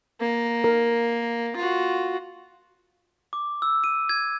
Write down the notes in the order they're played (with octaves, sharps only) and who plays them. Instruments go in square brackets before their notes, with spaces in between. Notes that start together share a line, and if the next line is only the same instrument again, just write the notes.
[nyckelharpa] A#3
[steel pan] A#4
[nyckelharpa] F4 F#4
[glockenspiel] D6
E6
D#7
G#6